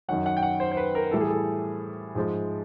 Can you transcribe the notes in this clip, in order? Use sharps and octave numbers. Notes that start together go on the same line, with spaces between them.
F#2 D#3 F#3 F#5
F#5
G5
F#5
C5
C5
B4
A#4
A2 E3 G3 A4
G#4
A4
G#2 F3 G#3